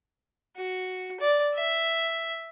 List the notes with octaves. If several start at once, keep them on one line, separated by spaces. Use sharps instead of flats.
F#4
D5
E5